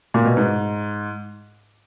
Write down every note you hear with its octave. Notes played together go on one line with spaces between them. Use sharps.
A#2
B2
G#2